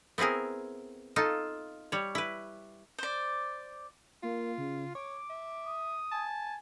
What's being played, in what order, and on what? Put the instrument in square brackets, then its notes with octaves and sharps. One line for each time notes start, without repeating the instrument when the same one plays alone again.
[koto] B3 C4 E4 G#4 A#4
D#4 F4 A4
G3 C#5
E4 B4
[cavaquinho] C5 D5
[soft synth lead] A#3 [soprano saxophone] F4
[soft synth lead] C#3
[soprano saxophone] C#5 [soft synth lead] D6
[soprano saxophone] E5
[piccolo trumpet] D#6
[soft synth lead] G#5 [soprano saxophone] A5